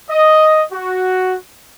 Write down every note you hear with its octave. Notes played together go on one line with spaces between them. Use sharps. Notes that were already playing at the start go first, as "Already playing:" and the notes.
D#5
F#4